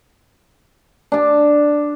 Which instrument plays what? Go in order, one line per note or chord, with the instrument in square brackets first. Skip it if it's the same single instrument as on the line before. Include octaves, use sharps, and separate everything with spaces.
[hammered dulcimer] D4 A5